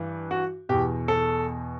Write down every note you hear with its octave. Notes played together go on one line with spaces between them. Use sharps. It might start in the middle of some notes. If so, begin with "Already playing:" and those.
Already playing: G2 E3
F#4
E2 B2 G4
A4